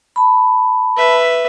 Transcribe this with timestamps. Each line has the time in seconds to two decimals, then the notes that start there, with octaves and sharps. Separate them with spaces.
0.16 A5 B5
0.97 B4 E5